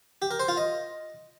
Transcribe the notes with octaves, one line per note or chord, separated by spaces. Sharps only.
G4
A#4
C5
F4
D#5